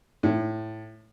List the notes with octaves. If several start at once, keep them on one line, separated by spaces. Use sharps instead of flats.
A2